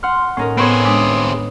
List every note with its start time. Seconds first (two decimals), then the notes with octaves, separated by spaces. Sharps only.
0.03 F#5 C6 F6
0.37 A2 C#4 D#4 A#4
0.58 A2 B3 C4 G#4 B4 C#5
0.85 G#3 D4 D#6